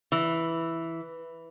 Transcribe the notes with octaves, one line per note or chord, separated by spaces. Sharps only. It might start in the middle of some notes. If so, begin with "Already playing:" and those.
E3